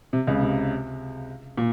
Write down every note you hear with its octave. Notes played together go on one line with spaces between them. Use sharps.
C3
C#2 C#3
C3
A#2